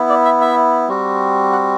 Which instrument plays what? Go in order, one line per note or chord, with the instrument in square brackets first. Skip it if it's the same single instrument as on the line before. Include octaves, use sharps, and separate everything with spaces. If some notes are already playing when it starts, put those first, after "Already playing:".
Already playing: [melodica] B3 E4
D5
E5
E5
G3 C4 F#4
F#5